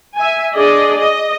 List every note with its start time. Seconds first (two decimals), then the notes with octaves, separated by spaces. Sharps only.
0.16 E5 G#5
0.55 D4 G#4 D5 D#5
0.97 D#5